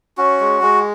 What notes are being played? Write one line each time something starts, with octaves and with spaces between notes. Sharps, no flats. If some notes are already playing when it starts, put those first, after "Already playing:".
C#4 F#4
G#3
G#3